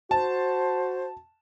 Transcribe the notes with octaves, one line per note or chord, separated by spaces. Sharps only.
F#4 C5 A5